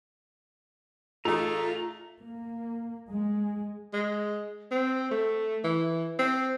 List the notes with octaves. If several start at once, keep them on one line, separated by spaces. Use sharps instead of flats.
A1 A3 D#4 F4 G#4 A#5
A#3
G#3
G#3
C4
A3
E3
C4